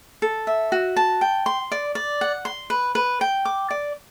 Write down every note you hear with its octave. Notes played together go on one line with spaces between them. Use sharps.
A4
E5
F#4
A5
G5
C6
D5
D5
F#5
C6
B4
B4
G5
D6
D5